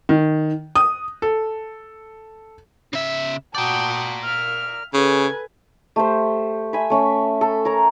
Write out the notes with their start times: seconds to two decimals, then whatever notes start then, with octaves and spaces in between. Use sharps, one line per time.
0.09 D#3
0.76 D#6
1.22 A4
2.93 C#3 E5
3.55 F#4 A#4 D5 G5 A5 D#6
4.24 E5 F5 F6
4.94 C#3 A4 B4 G#5
5.96 A3 G4 C5
6.73 E5 G#5 B5
6.90 A3 C#4 E5
7.41 A4
7.65 A#4 C#5 A#5